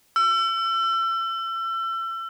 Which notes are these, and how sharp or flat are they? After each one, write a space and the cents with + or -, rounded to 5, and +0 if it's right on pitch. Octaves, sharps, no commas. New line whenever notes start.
E6 +35